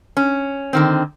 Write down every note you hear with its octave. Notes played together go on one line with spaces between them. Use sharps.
C#4
D3 D#3 C4